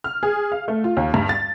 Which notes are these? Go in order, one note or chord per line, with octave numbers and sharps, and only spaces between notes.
F6
G#4
F5
A3
F4
D#2
G2
A6